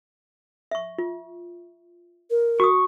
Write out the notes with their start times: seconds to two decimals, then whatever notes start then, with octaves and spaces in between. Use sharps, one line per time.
0.71 E5 C#6
0.98 F4
2.30 A#4
2.60 F#4 C#6 D#6